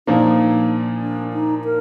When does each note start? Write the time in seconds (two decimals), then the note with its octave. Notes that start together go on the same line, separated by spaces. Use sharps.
0.07 A#2 F3 A#3 D4 D#4
1.02 D4
1.33 D#4
1.65 A#4